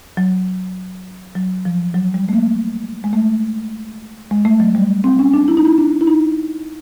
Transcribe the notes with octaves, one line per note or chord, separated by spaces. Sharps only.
F#3
F#3
F3
F#3
G3
A3
A#3
G#3
A3
G#3
A3
F#3
G3
C4
C#4
D4
E4
D#4
E4
D4
E4
D#4